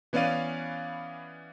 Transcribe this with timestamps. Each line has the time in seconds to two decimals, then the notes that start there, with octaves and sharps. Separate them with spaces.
0.13 E3 B3 C#4 D5 F5 D#7